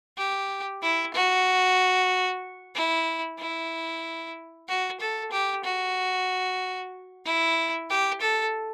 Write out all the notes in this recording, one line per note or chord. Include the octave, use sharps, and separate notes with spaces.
G4
E4
F#4
E4
E4
F#4
A4
G4
F#4
E4
G4
A4